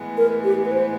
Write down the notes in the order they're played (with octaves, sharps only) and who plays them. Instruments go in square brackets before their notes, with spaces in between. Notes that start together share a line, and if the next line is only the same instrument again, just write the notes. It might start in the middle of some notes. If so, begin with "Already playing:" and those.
Already playing: [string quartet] A2 E3 G#3 B3
[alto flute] A#4
G4
B4
C5